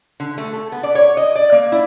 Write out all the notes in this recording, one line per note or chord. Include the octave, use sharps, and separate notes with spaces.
D3
A3
A4
B3
D5
C#5
D#5
D5
A#3
E4